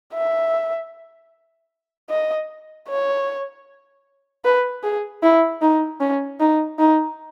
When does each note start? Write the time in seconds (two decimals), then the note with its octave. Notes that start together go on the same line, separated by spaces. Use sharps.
0.15 E5
2.10 D#5
2.89 C#5
4.45 B4
4.84 G#4
5.23 E4
5.62 D#4
6.01 C#4
6.40 D#4
6.79 D#4